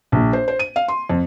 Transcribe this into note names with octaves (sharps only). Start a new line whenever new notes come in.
A#1
C5
C5
D#7
F5
C6
F2